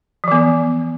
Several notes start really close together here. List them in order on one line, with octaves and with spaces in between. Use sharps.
F3 E3 B3